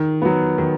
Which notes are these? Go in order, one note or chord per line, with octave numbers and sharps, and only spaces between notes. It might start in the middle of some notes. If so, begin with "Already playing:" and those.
Already playing: D#3
F#3 B3
D#3